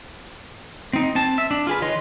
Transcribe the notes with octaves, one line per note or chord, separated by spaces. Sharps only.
C4 D#4
C4 A5
E5
D4
F4 G#4 B4
D#3 B4 C#5 D#5 C6